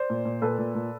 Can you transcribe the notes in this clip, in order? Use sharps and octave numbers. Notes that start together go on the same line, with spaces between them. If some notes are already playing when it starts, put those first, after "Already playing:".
Already playing: C5 D5
A#2
A#2
A#2 A4 B4
A#2
A#2